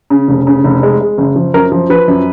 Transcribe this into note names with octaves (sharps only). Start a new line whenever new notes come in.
C#3
F1
C#3
F1
G#3
G#3
F#1
F3
F#2 A#4
F3
F3 B4
F#2